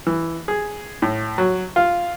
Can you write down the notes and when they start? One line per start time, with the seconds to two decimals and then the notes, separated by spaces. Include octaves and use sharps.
0.07 E3
0.48 G#4
1.02 A2
1.38 F#3
1.76 F4